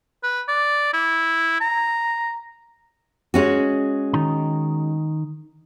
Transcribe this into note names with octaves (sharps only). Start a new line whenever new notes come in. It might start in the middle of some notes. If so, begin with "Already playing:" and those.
B4
D5
E4
A#5
G#3 C#4 F#4
D#3 D#4 A#5